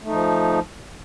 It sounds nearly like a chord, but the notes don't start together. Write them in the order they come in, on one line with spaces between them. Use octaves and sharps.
A3 D#4 F3